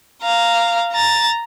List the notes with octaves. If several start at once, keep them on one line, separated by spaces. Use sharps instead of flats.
F5 A#5
A#5 A6